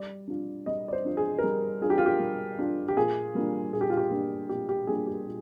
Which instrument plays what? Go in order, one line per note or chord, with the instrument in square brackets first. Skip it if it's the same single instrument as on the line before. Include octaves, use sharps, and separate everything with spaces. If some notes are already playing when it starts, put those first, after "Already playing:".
Already playing: [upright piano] G3 D5
D4 F4
G3 D#5
D5
C5
D4 F4
G#4
A#4
G3 G#4
D4 F4 G#4
G4
F4
G4
G3
D4 F4
G4
A#2 G#4
G3 A#3 D4 F4
A#2 G#4
G4
F4
G4
G3 A#3 D4 F4
A#2 G4
G4
G3 A#3 D4 F4 G#4
G4
A#2